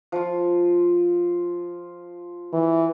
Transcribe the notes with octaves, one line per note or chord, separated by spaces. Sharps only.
F3 F4
E3